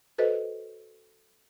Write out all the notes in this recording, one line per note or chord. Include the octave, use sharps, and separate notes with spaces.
F#4 A4 B4 C5 D#5